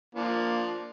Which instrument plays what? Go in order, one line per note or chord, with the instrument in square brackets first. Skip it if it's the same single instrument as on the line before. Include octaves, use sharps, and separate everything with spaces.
[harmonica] F3 D4 [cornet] A#3